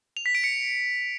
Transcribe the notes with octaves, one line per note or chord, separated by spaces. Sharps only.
F7
B6
D7
C#7